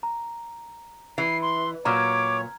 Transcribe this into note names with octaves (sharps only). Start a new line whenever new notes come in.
A#5
E3 C7
C6
A#2 F#3 C#5 A#5 D6 F6 G#6